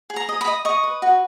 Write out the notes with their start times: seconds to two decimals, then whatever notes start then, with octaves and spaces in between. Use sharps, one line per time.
0.10 G#4
0.16 A#5
0.29 D#5
0.41 B5
0.47 D#5
0.65 D#5 C#6
0.83 B4
1.02 F#4